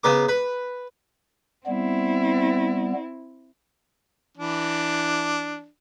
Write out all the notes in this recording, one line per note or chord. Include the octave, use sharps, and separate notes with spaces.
C#3 B3 A#4 D6
B4
G3 B3 C4 E4
E3 D4